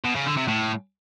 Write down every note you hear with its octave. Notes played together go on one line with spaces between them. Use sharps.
B2
C#3
D3
C3
A2